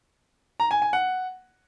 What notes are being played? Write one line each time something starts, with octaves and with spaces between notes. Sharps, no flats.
A#5
G#5
G#5
F#5